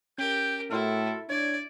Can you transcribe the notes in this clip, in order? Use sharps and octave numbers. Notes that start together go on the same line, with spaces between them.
C#4 G4 A#4 G6
A2 E4 F#4 A4 C6 F6
D4 C#5 D5 G#6